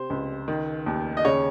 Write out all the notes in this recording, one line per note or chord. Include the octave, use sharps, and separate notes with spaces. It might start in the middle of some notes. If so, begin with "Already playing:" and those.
Already playing: C3 C5
C#2
D#3
D#2
D#5
C#3 C#5